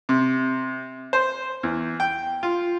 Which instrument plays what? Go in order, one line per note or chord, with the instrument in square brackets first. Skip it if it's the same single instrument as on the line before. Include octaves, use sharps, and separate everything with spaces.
[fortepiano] C3
C5
E2
G5
F4